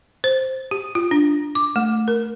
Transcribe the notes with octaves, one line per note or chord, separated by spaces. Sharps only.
C5
G4
F4
D4
D6
A3
A#4